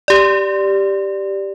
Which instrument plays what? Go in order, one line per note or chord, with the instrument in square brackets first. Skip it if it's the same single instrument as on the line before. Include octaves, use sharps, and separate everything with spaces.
[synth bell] G4 D5